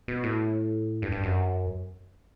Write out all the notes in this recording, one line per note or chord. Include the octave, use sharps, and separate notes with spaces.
B2
A2
G2
G2
F#2